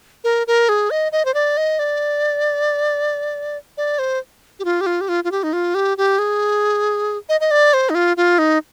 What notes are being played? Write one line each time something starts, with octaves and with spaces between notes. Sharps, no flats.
A#4
A#4
G#4
D#5
D#5
C5
D5
D#5
D5
D5
C5
G4
F4
G4
F4
G4
F4
F4
G4
D#4
F4
G4
G4
G#4
D#5
D#5
D5
C5
D#4
F4
F4
D#4